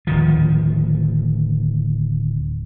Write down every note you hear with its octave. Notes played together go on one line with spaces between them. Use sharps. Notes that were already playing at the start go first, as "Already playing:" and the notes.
D1 D#3 F3